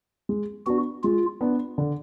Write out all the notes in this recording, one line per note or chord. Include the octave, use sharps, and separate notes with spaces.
G#3
B3 D4 F#4
G#3 F4
B3 D4
D3